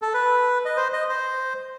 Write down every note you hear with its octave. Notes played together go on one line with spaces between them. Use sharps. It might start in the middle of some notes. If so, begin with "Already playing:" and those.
A4
B4
D#5
C5
D#5
C5